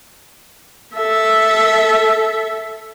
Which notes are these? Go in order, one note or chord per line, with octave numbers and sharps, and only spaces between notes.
A4 E5